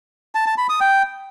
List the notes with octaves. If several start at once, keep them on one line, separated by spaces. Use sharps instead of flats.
A5
A5
B5
D#6
G5